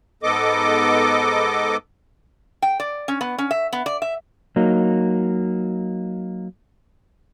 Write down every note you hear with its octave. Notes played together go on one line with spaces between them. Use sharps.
G#2 B3 A4 D#5 D6
G5
D5
C#4
B3
C#4
E5
B3
D5
E5
F#3 A#3 D#4